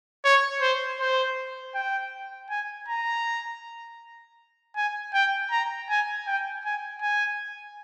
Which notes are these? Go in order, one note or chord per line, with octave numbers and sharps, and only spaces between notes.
C#5
C5
C5
G5
G#5
A#5
G#5
G5
A#5
G#5
G5
G#5
G#5